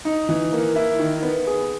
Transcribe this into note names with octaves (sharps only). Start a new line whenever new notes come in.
D#4
E3
A#3
E4
D#3
B3
G#4